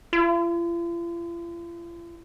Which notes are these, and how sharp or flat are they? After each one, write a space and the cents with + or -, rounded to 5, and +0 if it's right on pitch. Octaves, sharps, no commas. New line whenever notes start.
F4 -45